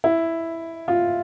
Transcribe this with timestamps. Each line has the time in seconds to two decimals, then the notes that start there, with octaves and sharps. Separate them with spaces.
0.04 E4
0.88 F4